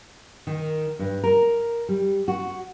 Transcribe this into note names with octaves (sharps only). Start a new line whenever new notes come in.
D#3
G2
A#4
G3
F#4